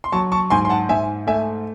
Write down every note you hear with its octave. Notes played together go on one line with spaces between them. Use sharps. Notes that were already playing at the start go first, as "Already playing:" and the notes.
C6
F#3 A5 C#6
A5 C#6
G#2 G#5 C6
C6
F#5 A5
G#2 E5 G#5
A3 E5 G#5